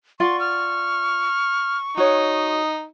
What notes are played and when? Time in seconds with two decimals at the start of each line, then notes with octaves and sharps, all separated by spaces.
0.20 F4 D5 F#5 C6 C#6
0.40 F6
1.97 D#4 F#4 C#5 D#6